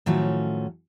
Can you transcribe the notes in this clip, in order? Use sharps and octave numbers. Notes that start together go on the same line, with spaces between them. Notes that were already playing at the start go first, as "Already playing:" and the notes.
A2 D#3 F3 F#3 A3 C#4